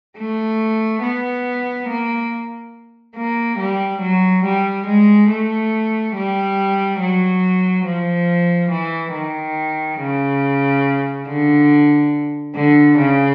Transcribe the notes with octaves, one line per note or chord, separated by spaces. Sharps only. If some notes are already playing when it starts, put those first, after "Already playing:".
A3
B3
A#3
A#3
G3
F#3
G3
G#3
A3
G3
F#3
F3
E3
D#3
C#3
D3
D3
C#3